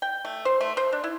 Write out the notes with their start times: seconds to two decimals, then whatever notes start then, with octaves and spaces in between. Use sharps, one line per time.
0.02 G5
0.25 A3
0.45 C5
0.61 A3
0.77 C5
0.92 D4
1.04 E4